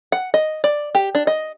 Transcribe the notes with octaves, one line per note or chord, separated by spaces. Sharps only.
F#5
D#5
D5
G4
D4
D#5